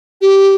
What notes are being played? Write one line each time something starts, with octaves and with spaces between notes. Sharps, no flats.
G4